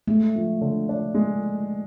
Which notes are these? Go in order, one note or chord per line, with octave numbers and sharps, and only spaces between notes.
G#3 A3
F3
D3
D4
G#3